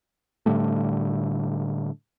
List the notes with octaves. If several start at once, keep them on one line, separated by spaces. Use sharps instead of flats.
A2 D3 G3 A3